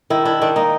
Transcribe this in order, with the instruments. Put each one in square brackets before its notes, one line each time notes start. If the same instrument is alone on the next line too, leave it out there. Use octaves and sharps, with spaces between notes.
[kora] D#3 E4
D4 E4
D#3 D4
A#3 D#4